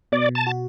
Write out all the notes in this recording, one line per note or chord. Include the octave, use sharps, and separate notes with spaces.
B2 D5
A5
F#4